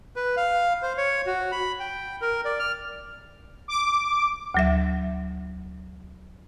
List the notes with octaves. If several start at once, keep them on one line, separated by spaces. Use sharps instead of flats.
B4
F5
C5
C#5
F#4
B5
G5
A#4
D5
F6
D6
D2 F#3 E5